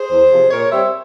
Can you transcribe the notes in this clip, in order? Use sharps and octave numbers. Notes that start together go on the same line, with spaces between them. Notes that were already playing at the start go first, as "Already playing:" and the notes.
Already playing: G#4 C5
E2
C3 F3
A#2 A#4 C#5
G3 C4 C5 E5